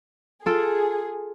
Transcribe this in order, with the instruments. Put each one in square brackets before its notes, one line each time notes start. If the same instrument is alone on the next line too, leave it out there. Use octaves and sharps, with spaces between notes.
[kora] F4 A4 G5 [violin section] G#4